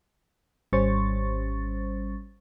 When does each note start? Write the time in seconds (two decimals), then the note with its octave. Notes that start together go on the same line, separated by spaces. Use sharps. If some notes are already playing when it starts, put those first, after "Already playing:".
0.73 G#1 G3 C#4 C5 C#6 A6